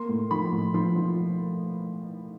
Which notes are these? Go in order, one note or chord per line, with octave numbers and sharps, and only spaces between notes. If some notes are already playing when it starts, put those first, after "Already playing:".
Already playing: A#3 C6
A2
F3 B5
A2
F3 C6
F3